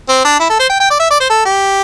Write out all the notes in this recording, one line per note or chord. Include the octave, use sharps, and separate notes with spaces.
C4
D4
E4
A4
C5
G5
G5
D5
E5
D5
C5
A4
G4